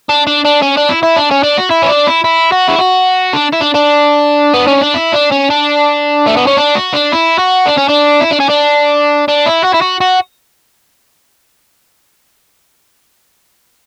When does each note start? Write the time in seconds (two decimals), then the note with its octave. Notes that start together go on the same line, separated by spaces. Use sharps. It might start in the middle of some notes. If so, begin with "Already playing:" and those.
0.09 D4
0.27 D4
0.45 D4
0.62 C#4
0.77 D4
0.89 E4
1.03 E4
1.16 D4
1.31 C#4
1.43 D4
1.58 F#4
1.71 E4
1.82 C#4
1.89 D4
2.07 E4
2.24 E4
2.52 F#4
2.68 E4
2.79 F#4
3.33 D4
3.53 E4
3.61 D4
3.74 D4
4.54 B3
4.68 C#4
4.82 D4
4.95 E4
5.13 D4
5.32 C#4
5.50 D4
6.27 A3
6.37 B3
6.47 C#4
6.57 D4
6.75 F#4
6.93 D4
7.12 E4
7.38 F#4
7.66 D4
7.77 C#4
7.88 D4
8.20 E4
8.31 D4
8.40 C#4
8.50 D4
9.28 D4
9.47 E4
9.65 F#4
9.74 E4
9.82 F#4
10.01 F#4